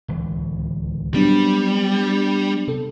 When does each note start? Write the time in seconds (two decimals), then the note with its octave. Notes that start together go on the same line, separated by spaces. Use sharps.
0.08 D1 C#2 E3
1.14 F#3 G3 B3 C4 D4
2.68 C3 A4